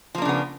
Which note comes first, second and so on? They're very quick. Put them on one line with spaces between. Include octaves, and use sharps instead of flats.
F3 A#3 D4 C#3 B3